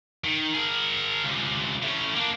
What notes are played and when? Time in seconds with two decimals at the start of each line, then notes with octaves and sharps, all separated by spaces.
0.24 D#3
0.53 G#4 A#4
1.25 C#2 C3
1.83 A2 C#4
2.16 A#3 D4